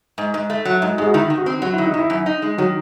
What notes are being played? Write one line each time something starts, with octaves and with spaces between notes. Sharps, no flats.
G#2
G#2
A3
F#3
G#2
G#2 G#4
F#4
D#3 E4
D#3
F#4
C4
F#3 F#4
D#3 E4
D#4
D#3 E4
F#2
D#4
G#3
D#3 F#3